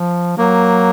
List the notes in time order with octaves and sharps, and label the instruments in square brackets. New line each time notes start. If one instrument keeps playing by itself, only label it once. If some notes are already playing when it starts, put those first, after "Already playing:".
Already playing: [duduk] F3
[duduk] F#3 [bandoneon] A#3